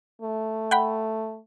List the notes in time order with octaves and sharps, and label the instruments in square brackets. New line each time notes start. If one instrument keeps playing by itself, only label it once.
[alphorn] A3
[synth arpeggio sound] F#5 G5 B5